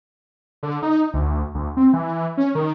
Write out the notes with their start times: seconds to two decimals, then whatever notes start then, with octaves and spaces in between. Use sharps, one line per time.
0.63 D3
0.83 D#4
1.14 D2
1.55 D2
1.77 C4
1.93 E3
2.37 C#4
2.55 D#3